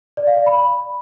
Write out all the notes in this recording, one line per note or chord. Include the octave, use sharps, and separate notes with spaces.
D5
F5
D5
B5